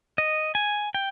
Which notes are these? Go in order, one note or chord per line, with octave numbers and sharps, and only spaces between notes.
D#5
G#5
G5